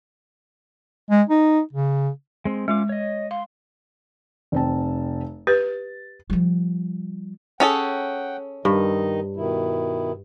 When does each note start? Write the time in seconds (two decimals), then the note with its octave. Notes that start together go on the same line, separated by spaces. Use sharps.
1.10 G#3
1.29 D#4
1.73 C#3
2.45 G#3 C4
2.68 G#3 C#4 F4 D6
2.89 C#5 D#5
3.31 F5 C6
4.52 F1 C4 A5
5.47 G4 B4 A6
6.30 F3 G3
7.60 C#4 G#4 A4 F#5 G5
8.65 G2 D#3 D#4 D#5
9.36 B2 D#3 E4